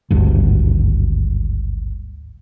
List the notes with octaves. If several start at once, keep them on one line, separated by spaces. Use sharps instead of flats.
G#1 D2 G2